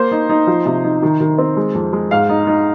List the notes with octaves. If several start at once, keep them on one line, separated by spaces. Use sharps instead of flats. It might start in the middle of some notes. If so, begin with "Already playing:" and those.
Already playing: A#3 C5
D#4
D#4
F3
C3
D#4
D#3
D#3
C4
G#3
F2
G#3
G#2 F5
D#4
D#4